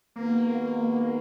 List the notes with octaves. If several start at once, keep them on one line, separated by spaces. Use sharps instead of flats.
D#2 D#3 G#3 A#3 B3 F#4